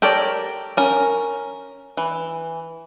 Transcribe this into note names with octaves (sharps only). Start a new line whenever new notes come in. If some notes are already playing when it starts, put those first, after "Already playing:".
G4 A4 A#4 C#5 D5
C#4 A#4
E3